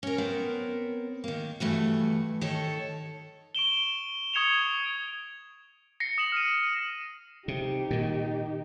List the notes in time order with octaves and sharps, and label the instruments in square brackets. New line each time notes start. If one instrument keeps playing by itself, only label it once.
[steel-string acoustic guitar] C#4 A#4
B3 C4 A#4 C#5
D#3 A#3
G2 E3 A3 F#4
D#3 A4 C#5
[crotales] C#6 D7 E7 G7
C#6 D#6 G#6 C#7 E7 F7
A#6 C7 C#7
D#6 E7 F#7
F6 D#7
[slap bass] C3 [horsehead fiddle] D#4 G4
[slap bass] A#2 D#3